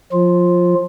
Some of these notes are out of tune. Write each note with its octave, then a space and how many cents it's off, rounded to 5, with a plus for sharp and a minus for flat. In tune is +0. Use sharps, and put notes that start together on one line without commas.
F3 +25 F4 +0